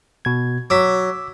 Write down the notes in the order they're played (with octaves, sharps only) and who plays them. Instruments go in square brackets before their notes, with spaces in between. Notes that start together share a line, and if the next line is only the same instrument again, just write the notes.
[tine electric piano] B2 G#6
[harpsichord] F#3 [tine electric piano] D6 E6 B6